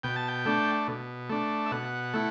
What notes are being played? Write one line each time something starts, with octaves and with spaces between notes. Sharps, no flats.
B2 G5
A5
G5
A3 D4
B2
A3 D4
E5
B2 F#5
A3 E4